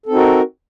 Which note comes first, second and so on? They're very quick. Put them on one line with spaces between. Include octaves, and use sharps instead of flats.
A4 C4 D#4 F#4 A#4